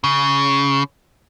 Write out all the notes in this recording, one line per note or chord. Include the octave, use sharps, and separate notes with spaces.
C#3